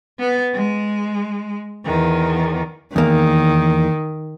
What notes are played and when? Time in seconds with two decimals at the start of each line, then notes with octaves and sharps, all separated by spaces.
0.19 B3
0.54 G#3
1.85 E2 D#3
2.96 E2 D#3 A#3